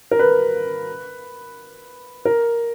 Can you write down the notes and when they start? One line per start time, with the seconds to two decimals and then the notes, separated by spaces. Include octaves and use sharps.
0.11 A#4
0.19 B4
2.25 A#4